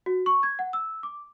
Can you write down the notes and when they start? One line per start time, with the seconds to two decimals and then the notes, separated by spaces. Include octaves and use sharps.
0.06 F#4
0.26 C#6
0.43 G#6
0.59 F#5
0.73 E6
1.03 D6